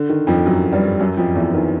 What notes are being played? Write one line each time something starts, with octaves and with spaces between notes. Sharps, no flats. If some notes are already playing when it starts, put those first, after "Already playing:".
Already playing: D3
D#3
F2 F3
F#2 F#3
G2 G3
F#2 F#3
F2 F3
E2 E3
D#3